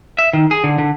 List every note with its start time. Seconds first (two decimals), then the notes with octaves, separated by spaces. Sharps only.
0.19 E5
0.33 D#3
0.51 G#4
0.64 D3
0.78 D3